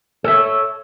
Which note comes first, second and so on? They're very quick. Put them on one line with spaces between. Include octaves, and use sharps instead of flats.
A4 E5 C#5